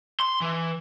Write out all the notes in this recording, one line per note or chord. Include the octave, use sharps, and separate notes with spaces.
C6
E3